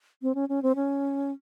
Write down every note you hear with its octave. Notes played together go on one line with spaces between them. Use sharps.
C4
C#4
C#4
C4
C#4